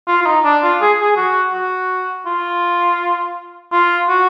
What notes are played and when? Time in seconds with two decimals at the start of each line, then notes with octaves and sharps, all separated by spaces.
0.07 F4
0.22 F4
0.26 D#4
0.44 D4
0.63 F4
0.81 G#4
1.01 G#4
1.17 F#4
1.53 F#4
2.26 F4
3.72 F4
4.09 F#4